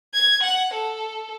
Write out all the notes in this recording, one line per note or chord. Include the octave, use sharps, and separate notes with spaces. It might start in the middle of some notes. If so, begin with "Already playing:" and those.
G#6
F#5
A4